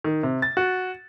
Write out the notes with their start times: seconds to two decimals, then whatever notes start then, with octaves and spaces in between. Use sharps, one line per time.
0.04 D#3
0.23 C3
0.42 A6
0.57 F#4